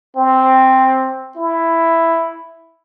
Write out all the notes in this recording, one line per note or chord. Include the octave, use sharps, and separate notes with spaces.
C4
E4